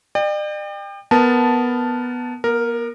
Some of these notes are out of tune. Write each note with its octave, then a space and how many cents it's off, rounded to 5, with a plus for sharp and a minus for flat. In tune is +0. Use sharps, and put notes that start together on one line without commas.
D5 +45 G5 +25
B3 +0 A#4 +0 A5 +0
B3 -45 A#4 +0